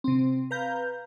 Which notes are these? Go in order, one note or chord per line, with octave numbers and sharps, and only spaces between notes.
C3 C4
B4 F5 A#5 G6